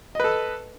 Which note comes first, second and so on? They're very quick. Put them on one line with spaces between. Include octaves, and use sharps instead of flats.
D#5 B4 A4